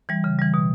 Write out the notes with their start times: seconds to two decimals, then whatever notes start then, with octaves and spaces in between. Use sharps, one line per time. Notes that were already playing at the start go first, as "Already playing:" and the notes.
0.09 E3 G3
0.24 C#3
0.39 E3 G3
0.54 B2